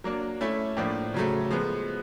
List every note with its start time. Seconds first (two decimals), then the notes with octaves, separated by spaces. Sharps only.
0.04 F#3 A#3 D4
0.41 A3 C#4 E4
0.77 A2 F3 A#3 D4
1.14 C#3 F#3 A3
1.51 F3 G#3 B3